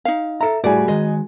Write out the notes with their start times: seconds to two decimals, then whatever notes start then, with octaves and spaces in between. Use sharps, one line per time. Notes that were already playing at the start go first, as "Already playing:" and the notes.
0.05 D#4 F5
0.41 A4 E5 A#5
0.64 A2 G3 A3 F#4 G#4 D5 G#5
0.88 D#3 G#3 D#5